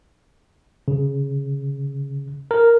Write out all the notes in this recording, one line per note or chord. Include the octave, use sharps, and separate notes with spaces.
C#3
A#4